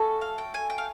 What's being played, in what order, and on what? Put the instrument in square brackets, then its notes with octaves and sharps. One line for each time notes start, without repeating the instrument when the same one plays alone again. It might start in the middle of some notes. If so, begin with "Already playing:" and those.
Already playing: [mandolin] A3 C#4 F#4 A4
F5
G5
G#5
G5
F5